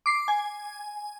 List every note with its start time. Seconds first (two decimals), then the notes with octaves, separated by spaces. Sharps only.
0.06 D6 C7
0.28 G#5